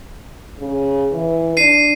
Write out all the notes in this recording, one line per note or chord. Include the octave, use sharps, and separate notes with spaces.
C#3
E3
D4 C7 D#7